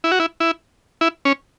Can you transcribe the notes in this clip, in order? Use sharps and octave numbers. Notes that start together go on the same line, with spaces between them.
E4
F#4
E4
E4
E4
C#4